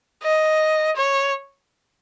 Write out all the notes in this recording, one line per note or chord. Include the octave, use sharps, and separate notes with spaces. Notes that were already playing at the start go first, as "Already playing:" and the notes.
D#5
C#5